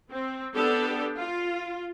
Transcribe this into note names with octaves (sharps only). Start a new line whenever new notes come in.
C4
B3 D4 G4 A4
F4